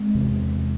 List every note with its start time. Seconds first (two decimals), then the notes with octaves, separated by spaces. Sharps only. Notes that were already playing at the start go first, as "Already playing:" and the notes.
Already playing: G#3 C4
0.15 E2 C3